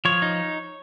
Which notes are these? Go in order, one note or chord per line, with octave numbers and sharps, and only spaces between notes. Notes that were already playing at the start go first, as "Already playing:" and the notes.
F3 C#5
D#4